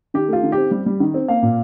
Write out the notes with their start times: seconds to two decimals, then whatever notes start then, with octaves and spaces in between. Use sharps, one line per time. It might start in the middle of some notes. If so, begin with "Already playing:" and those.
0.14 D#3 G4
0.28 A3 F4
0.43 D#3
0.52 C4 G4
0.71 G3
0.86 G3
1.00 D#3
1.14 C4
1.28 A#3 F5
1.42 A#2